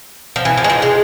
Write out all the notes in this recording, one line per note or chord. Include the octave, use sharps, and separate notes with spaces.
F3
E3
F3
G#3
F3
G#3